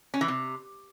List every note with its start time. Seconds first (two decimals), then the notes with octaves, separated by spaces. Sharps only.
0.14 C#4
0.21 E3
0.28 C3